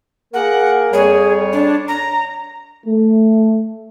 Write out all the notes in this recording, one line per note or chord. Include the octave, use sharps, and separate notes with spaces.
A#3 G#4 A#4 F#5
F2 G3 G#4 C#5
D4
A#5
A3